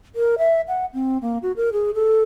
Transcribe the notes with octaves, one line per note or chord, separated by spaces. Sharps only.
A#4
E5
F#5
C4
A#3
F#4
A#4
G#4
A4